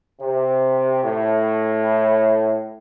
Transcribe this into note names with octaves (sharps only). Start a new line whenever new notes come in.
C3
A2